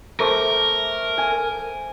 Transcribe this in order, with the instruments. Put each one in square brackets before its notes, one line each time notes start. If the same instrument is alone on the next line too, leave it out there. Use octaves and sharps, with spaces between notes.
[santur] A3 C5 D6 [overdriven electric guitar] A#4
[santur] G#5